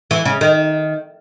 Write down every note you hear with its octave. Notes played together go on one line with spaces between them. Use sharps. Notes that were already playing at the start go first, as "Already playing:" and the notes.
E3
C#3
D#3